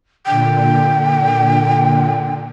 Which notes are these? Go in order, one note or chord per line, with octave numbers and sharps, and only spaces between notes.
A#2 D3 G5